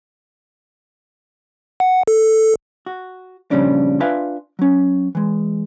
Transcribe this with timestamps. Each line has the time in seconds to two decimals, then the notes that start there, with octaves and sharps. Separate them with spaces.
1.80 F#5
2.08 A4
2.86 F#4
3.51 F2 A#2 C#3 G3 C#4 D4
4.00 D4 F4 B4 E5 F5 G#5
4.59 F#3 C#4
5.15 E3 G#3